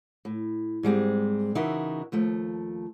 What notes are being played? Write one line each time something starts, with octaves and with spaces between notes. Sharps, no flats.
A2
G#2 G3 G#3 C4
C#3 E3 D#4 F#4 A#4 E5
D#2 F3 A3